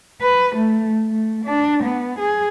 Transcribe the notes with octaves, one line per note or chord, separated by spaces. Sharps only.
B4
A3
A3
D4
B3
G#4